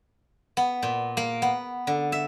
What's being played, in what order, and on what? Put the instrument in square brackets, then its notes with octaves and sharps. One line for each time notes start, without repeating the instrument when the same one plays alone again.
[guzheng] B3
A#2
A#3
B3
D3
E5